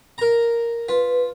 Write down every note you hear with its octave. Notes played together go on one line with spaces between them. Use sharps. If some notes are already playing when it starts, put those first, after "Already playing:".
A#4 A#5
F4 B4